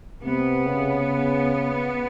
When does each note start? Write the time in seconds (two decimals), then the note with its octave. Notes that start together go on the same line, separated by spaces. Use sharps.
0.23 C3 B3
0.66 C#3